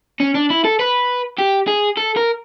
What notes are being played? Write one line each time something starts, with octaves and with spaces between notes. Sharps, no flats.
C#4
D4
E4
A4
B4
G4
G#4
A4
A#4